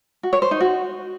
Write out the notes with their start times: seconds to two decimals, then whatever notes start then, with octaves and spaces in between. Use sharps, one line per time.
0.23 F#4
0.33 C#5
0.42 C5
0.51 D#4
0.61 F#4